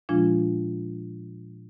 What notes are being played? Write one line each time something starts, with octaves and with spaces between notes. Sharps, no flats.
A#2 F3 G#3 D4 F4